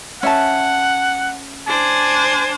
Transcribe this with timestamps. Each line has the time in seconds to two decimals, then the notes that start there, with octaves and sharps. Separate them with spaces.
0.23 C#4 E5 F#5 A5
1.68 D4 C5 G#5